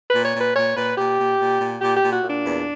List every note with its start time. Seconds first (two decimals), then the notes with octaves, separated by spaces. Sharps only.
0.09 A#2 B4
0.24 C#5
0.35 A#2
0.40 B4
0.55 A#2 C#5
0.76 A#2 B4
0.97 A#2 G4
1.19 A#2
1.40 A#2
1.61 A#2
1.81 A#2 G4
1.97 A#2 G4
2.13 F#4
2.23 A#2
2.29 D4
2.44 E2